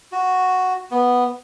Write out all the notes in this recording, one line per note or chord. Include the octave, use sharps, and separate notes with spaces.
F#4
B3